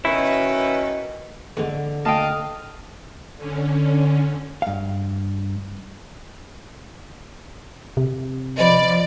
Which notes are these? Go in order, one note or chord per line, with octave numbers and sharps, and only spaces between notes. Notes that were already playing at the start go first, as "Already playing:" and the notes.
B2 D#3 C#4 E4 B4
E2 G#2 D3
D2 D#5 F5 G5 A5
D3 C#4
G2 F5
C3
F3 D5 D#5 B5